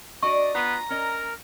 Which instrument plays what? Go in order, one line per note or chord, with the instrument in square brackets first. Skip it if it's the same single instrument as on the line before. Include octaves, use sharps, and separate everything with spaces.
[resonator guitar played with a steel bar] D4 F#4 D5 [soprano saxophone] D#5 [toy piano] C#6
[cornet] B3 [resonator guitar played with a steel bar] F4 [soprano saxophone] A#5
[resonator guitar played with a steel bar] C#4 D#5 [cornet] A#4